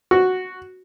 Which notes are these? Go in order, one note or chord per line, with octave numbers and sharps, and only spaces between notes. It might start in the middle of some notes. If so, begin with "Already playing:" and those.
F#4